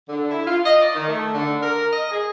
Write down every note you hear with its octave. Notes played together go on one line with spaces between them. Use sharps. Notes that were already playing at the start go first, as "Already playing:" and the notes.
D3
E4
F4
D#5
D5
D#3
A3
D3
A#4
D#5
G#4